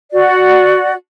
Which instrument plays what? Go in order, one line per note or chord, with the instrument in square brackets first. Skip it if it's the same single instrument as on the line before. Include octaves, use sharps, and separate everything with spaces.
[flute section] F#4 D5